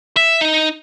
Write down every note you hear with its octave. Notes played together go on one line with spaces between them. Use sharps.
E5
D#4